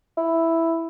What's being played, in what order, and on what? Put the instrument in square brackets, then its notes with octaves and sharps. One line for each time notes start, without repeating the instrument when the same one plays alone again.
[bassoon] E4